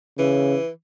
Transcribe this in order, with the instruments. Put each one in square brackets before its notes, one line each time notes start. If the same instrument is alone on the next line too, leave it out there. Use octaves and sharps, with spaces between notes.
[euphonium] C#3 [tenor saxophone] E3